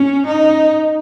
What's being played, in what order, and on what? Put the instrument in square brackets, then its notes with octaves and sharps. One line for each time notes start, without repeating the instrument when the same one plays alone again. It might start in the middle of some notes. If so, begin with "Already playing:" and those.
Already playing: [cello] C#4
D#4